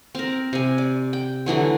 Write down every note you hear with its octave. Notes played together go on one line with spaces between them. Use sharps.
C4 A#4
C3 G#5
D5
G5
D3 E3 F#3 A3